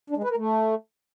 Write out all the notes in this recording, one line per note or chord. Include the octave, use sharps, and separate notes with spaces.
D4
G#3
B4
A#4
A3